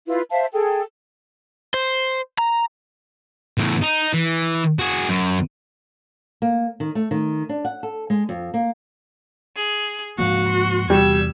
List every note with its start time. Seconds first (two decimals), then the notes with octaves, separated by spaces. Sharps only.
0.07 E4 F4 B4
0.30 C5 E5 F5 A5
0.53 G#4 A4 G5
1.74 C5
2.38 A#5
3.58 E2 A2
3.82 D#4
4.14 E3
4.79 F#4 G#4
5.09 F#2
6.42 A#3
6.80 D#3
6.95 A3
7.11 D#3
7.49 D4
7.65 F#5
7.83 A4
8.10 G#3
8.29 F2
8.54 A#3
9.56 G#4
10.19 G#2 F3 A#3 F#4 F5
10.48 C6
10.90 E2 C3 G3 E6 G#6